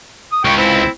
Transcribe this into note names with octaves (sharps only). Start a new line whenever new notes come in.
D#6
C#2 G5 C#6
C4 E4